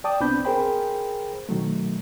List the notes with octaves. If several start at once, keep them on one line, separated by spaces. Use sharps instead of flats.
D5 G5 A5 D6 D#6
C2 B3 C4 D4 B5 G6
G#4 A#4 C5 G5 B5
B2 D#3 F#3 A3